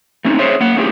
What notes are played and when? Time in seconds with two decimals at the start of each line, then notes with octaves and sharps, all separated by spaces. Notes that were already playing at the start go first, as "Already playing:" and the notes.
0.25 A3 C4 C#4 D#4
0.39 G#4 C5 C#5 E5
0.61 A#3 F#5
0.76 A3 C#4 E4 F4 G4 G#4